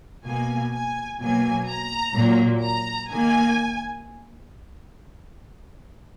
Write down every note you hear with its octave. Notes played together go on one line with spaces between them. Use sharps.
B2 A#3 G#5
G#5
B2 F#3 A#3 G#5
A#5
A#2 F#3 A#3
A#5
D#3 A#3 G#5